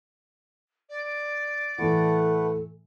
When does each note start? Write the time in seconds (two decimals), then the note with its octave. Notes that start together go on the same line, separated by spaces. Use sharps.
0.89 D5
1.78 A2 E3 A3 A4 B4 F#5